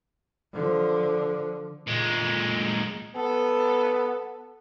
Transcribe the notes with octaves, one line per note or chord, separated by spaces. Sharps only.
D3 F3
A#2 G#3
B3 A4